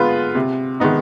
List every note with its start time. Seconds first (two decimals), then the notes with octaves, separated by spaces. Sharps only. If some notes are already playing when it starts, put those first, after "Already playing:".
Already playing: D3 G#3 B3 F4 B4
0.35 C3
0.80 D#3 G#3 B3 D#4